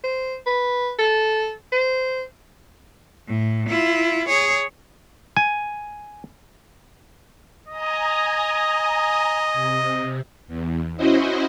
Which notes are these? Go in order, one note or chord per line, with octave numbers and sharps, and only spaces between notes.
C5
B4
A4
C5
A2
E4 F4
G#4 C#5
G#5
D#5 G#5 A#5 D#6
C3
E2
C#4 E4 F#4 C5 D#5